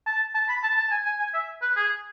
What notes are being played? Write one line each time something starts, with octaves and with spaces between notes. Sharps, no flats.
A5
A5
B5
A5
A5
G#5
G#5
G#5
E5
B4
G#4